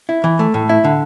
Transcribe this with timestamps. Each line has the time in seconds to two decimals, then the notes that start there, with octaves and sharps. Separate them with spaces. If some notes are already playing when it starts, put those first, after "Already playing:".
0.09 E4
0.24 E3
0.39 A3
0.54 A2
0.69 E4
0.84 D3